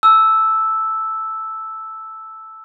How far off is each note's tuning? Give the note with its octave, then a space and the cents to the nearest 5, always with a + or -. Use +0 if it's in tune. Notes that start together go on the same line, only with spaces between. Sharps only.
A5 +0 E6 -5